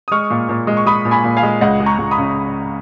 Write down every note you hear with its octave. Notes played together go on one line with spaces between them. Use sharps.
D#6
G#3 C#6 F6
A#2
A#2
G#3
C#6
G#3 B5 D#6
A#2
G#5 B5
A#2
F5 G#5
G#3
C#2 D#5 F#5
G#3
A#5 C#6
C#2
B5 D#6
C#3